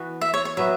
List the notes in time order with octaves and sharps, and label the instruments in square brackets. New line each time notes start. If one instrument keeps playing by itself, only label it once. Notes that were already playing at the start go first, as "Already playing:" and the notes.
Already playing: [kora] E3 B3 F#4
[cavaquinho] E5
C#5
C#5
[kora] F#3 B3 F#4 [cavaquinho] E5